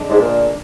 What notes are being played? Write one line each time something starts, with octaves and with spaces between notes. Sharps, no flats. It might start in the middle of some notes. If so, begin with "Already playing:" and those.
Already playing: D3 G#3 D4
G#2
A#2